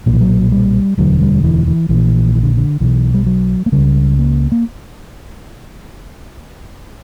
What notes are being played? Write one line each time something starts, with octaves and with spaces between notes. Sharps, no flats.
B1 A#2 F#3
E3
F#3
G3
E1 D2 D3 F#3
G3
E3
E3
A#1 A#2 E3
E3
D3
D3
B1 B2 E3
G3
F#3
A#3
C#2 C#3 G3
A#3
A#3